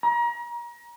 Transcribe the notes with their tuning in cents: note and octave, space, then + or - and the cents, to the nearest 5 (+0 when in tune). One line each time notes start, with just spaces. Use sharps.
A#5 +35